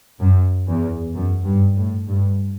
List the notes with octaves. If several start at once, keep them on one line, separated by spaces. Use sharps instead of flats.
F#2
E2
F#2
G2
A2
G2